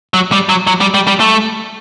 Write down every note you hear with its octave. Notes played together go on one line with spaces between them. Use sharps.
F#3
G3
F#3
F#3
G3
G3
G3
A3